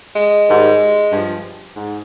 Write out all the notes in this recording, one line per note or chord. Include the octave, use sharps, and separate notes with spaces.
G#3
G#2 D#3 G3
G2 F3
G#2